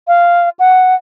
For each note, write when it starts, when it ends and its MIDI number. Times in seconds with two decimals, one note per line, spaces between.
0.08 0.49 77
0.59 0.95 78